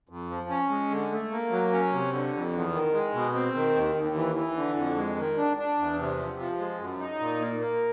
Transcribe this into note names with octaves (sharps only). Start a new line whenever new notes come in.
F2
F3
C#4
G#3
D3
A3
A#3
F#3
C#4
C3
D3
F2
E2
D#3
G#3
B2
C4
D#3
D#2
D#2
E3
E3
D3
F2
G#3
D#3
D4
D4
E2
C3
F3
F3
G#3
F#2
D#4
A#2
A#3
A#3